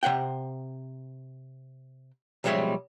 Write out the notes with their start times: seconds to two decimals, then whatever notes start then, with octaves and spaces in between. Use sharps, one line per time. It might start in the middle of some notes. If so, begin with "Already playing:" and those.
0.03 C3 C5 F#5 G5
2.44 B1 F3 G3 G#3 C#5 E5